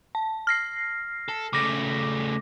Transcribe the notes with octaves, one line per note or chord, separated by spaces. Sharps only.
A5
F6 A#6 C7
A4
C#3 A3 D6 A#6